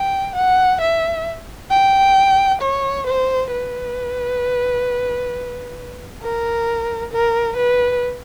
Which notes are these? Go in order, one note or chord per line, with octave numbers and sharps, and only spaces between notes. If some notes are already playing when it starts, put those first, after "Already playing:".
Already playing: G5
F#5
E5
G5
C#5
C5
B4
A#4
A#4
B4